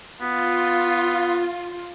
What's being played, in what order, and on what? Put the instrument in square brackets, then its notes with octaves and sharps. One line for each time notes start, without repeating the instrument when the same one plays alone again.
[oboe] B3 [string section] F4